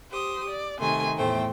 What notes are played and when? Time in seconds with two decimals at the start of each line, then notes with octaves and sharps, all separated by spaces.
0.10 G4 C5 D#6
0.49 D5
0.79 C3 D#3 A3 G#5 C6
1.18 E2 A2 A3 C5 G5